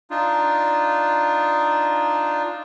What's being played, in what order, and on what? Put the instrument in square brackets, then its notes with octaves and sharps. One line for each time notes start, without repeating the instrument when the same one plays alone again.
[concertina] D4 D#4 F4